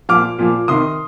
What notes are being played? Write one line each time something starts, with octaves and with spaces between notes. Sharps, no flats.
A#2 F3 D6 F6
A#2 F3
C3 D#3 C6 D#6